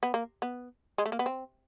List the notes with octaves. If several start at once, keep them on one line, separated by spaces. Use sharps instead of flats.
B3
A#3
B3
G#3
A3
A#3
B3
C4